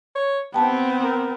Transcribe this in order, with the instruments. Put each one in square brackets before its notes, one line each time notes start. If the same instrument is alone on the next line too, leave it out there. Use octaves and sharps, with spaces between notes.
[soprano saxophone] C#5
[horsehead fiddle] B3 C4 [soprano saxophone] G4 [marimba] G5 A5
[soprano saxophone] A#4